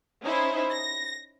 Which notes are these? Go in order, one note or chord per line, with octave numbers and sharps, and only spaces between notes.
C#4 D#4 E4 C5
A#6